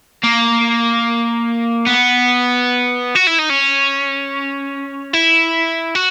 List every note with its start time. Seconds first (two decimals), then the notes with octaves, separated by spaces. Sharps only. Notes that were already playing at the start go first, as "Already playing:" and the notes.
0.24 A#3
1.86 B3
3.16 F#4
3.27 E4
3.39 D#4
3.50 C#4
5.14 E4
5.95 F#4